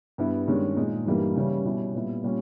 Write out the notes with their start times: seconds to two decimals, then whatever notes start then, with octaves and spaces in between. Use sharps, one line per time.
0.18 G2 G3 B3 E4
0.48 G2 D#3 G#3 C#4
0.76 A#2 G#3 D#4
1.06 G2 E3 G3 A#3 D#4
1.35 C#3 E3 G3 C#4 E4
1.65 B2 G3 C#4 E4
1.95 A#2 G3 B3 E4
2.24 A#2 G3 C#4